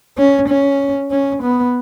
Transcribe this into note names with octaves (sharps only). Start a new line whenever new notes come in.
C#4
C#4
C#4
B3